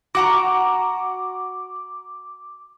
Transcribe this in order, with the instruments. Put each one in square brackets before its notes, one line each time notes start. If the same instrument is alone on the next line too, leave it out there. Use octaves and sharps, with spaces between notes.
[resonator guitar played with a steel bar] F#4 F#5 A#5 [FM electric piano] D6